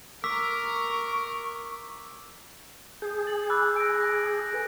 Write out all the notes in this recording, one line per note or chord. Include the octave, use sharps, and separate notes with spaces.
A#4 A#5 C#6 D6 E6 B6
G#4 G6
A6 F#7
B5 D6 E6 F#6 A6
A#6 D7
A#6
A4 B4 G#5